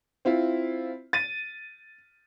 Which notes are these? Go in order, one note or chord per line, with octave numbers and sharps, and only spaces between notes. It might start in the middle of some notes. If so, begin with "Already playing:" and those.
C4 E4 F4
A6 D#7